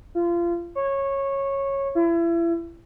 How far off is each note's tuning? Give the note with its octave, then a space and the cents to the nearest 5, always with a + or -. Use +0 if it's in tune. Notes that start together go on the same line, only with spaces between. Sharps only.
F4 -25
C#5 -15
E4 +35